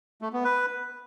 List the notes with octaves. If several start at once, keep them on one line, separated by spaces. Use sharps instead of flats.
A3
B3
B4